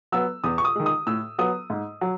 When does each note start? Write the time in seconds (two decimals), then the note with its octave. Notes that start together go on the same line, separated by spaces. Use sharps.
0.12 F#3 B3 E6
0.44 E2 D#6
0.58 C#6
0.65 D#6
0.76 D#3 G#3
0.86 D#6
1.07 A2 E6
1.39 F#3 B3 D#6
1.70 G#2
2.01 F#3